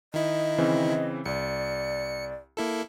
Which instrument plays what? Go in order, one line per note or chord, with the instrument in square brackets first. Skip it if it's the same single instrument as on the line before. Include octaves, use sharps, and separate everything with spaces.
[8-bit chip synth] D#3 E4 [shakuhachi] D#5
[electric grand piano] C#3 E3 C4
[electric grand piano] C2 [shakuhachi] D5 [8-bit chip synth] C#7
[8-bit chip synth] A#3 E4 A4